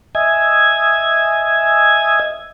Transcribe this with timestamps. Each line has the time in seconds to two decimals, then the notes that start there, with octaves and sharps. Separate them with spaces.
0.15 D#5 E5 G#5 G#6